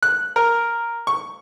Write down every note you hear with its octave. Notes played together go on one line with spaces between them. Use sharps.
F#6
A#4
C#6